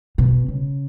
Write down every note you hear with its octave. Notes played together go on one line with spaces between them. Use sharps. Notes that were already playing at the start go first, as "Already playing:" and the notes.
B2
C#3